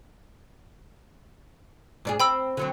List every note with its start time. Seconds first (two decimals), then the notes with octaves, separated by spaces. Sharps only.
2.05 G#2 D4 G#4
2.20 C4 G5 B5 E6
2.57 D3 F#3 C4